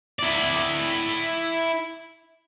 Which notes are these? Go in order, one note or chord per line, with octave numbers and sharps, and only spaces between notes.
E4 D5